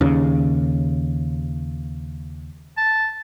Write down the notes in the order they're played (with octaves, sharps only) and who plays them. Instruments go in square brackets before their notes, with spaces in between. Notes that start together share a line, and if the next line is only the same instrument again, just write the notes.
[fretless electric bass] D#2 C#3
[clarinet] A5